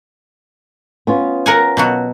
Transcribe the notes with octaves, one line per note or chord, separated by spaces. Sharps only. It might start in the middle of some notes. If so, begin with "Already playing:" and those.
B3 C#4 F4
A#4 F#5 G#5
B2 F#3 F#4